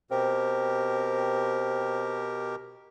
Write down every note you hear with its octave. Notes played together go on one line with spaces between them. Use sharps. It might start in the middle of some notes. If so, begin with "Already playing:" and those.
B2 C4 G4 A#4